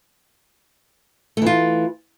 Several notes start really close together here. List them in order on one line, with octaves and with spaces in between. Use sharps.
A3 E3 F4